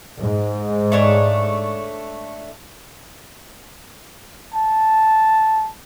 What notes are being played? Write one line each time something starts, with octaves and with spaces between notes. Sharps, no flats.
G#2
A3 D4 C#5
A5